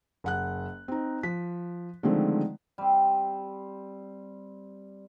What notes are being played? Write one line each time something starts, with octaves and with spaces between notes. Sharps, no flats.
F#1 F#5 F#6
C4 D#4
F3 B6
D3 D#3 F3 G#3 A3 C4
G3 C4